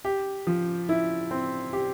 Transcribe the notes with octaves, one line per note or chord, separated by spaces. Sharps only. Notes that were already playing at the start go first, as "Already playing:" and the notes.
G4
F3
E4
C4
G4